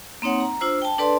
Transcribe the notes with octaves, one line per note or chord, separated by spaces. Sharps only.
A#3 C4 D#4 C#5 F#5
A#5
D4 F4 C5 E6
G5 A5
D4 A4 B4 D5 A5 C6